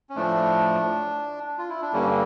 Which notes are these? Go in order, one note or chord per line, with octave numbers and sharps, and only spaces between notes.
C#4
A2 F3 A3 D4
F4
E4
D4
G2 D3 G3 A#3 C#4